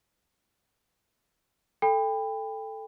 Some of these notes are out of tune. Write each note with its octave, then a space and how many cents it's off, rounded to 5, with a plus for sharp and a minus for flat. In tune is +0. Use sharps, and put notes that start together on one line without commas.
A4 +0 G5 +30 B5 +20